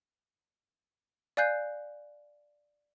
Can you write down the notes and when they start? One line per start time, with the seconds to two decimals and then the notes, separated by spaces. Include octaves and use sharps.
1.37 D5 F5 G#5 F#6 G6 C7